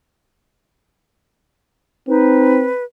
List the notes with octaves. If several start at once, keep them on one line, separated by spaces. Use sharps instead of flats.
C4 D#4 B4